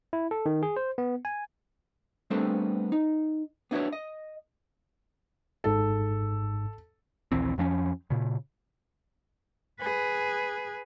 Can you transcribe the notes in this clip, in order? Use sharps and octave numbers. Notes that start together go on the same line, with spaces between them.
E4
A4
D#3
G#4
C5
B3
G#5
G3 A3 B3 C4 D4 A4
D#4
B3 D4 E4 F#4 B4 C#5
D#5
G#1 G#2 A4
A#1 D#2 E3 C4
F2 F3 C4 C#4
A#2 C#3
G#4 B4